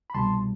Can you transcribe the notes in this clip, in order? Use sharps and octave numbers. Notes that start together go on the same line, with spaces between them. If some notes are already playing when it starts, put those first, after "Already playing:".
B5
C2 B2 G3 A5 C6